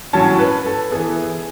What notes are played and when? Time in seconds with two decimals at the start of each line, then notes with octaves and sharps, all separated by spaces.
0.13 A2 F#3 C#4 A5
0.39 B4
0.66 A4
0.91 E3 B3 G#4